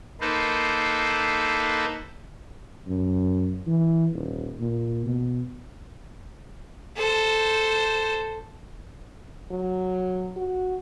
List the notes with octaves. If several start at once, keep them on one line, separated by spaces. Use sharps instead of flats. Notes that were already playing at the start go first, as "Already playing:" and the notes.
A#3 D#4 A4 B4 C5
F#2
E3
D#1
A#2
B2
A4 C5
F#3
F#4